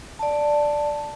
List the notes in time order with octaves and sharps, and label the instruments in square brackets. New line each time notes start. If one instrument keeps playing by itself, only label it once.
[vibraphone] D5 A5